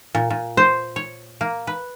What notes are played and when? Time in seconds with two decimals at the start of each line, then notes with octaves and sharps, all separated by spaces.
0.15 A#2
0.30 A#2
0.57 C5
0.96 C#5
1.41 A#3
1.67 B4